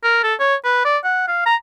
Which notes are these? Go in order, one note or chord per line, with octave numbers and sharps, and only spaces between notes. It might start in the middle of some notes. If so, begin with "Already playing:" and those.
A#4
A4
C#5
B4
D5
F#5
F5
A#5